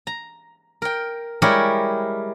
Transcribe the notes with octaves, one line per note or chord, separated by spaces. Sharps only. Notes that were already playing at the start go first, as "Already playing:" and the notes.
A#5
A#4 G5
G3 G#3 E4 G4 A#4 C#5